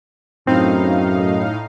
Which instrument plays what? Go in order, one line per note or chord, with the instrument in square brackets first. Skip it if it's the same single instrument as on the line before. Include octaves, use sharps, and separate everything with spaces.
[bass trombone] F#2 [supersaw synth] A2 D#4 F5 [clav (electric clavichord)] C4